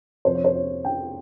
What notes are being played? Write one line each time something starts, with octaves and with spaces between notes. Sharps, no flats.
F2 C3 F3 C5
C#5
C5
C#5
G5